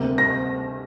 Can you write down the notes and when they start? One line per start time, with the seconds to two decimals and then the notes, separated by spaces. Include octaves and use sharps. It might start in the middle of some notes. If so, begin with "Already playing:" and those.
Already playing: D2 C3 G3 A#3
0.18 A#6